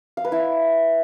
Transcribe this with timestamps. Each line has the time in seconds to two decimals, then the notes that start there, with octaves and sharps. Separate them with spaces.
0.17 F5
0.25 B4
0.32 E4